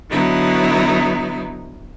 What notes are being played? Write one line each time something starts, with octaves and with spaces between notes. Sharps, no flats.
D3 F#3 B3 D#4 E4